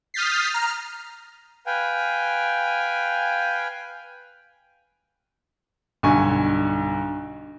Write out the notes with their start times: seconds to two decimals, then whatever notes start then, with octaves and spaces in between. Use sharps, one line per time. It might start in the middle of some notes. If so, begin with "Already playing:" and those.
0.14 D#6 F6 G6 A6 B6 C7
0.50 A#5 F6
1.67 B4 F5 G5 G#5
6.03 B1 G2 D3 G#5 C#6